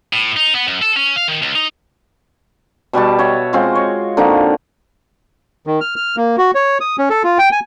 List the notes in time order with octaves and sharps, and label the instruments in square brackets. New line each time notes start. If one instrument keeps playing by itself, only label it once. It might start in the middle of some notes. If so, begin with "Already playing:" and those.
[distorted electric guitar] A2
D#4
B3
F#2
A4
C#4
F5
D#3
C#2
D#4
[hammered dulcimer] B2 G3 F#4 A5
C#5 D#5 E5 F#5
G#3 C4 F4 F#4
C#5
D3 A#3 C4 D#4
[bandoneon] D#3
F6
F6
A#3
F#4
C#5
D#6
C#4
A4
F4
G5
G#5